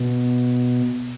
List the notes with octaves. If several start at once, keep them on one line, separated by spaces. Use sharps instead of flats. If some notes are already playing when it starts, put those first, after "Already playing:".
Already playing: B2